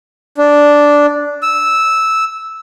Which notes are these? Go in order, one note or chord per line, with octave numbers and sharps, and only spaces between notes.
D4
E6